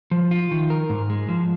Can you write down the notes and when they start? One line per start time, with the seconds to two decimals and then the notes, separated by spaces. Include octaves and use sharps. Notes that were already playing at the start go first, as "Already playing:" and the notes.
0.11 F3
0.31 F4
0.51 D#3
0.70 A#4
0.90 G#2
1.10 G#3
1.29 F3